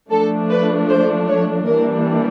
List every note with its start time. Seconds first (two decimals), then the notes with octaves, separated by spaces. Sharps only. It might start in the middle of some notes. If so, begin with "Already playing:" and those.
0.11 F3 A3 D4 A4
0.49 B4
0.89 C5
1.28 C#5
1.66 E3 G3 A#3 D4 A#4